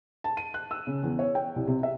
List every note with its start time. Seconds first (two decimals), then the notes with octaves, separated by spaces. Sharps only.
0.24 A5
0.37 D#7
0.54 F#6
0.71 E6
0.87 C#3
1.03 E2
1.19 C#5
1.35 G5
1.56 C2
1.67 C3
1.83 E5